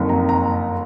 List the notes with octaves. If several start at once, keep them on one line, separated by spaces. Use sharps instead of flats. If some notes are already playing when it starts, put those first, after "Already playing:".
Already playing: F#1 F2 D#3
A#5
A#5